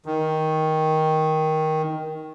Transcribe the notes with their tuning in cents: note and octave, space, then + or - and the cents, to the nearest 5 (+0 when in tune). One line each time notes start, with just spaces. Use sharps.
D#3 +10